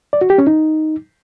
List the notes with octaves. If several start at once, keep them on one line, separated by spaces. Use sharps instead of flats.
D5
F#4
G4
C#4
D#4